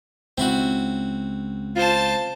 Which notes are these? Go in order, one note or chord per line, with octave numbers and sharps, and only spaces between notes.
C#2 C4 E4 F#4
F4 C5 A5